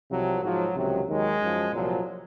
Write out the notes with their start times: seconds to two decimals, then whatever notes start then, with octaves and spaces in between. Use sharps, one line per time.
0.10 C2 C3 F3 F#3
0.43 G#2 F3 F#3
0.75 C#2 C3 D#3 F#3
1.08 D#2 D#3 F#3 G#3
1.41 F#2 F3
1.73 C2 A#2 F3 F#3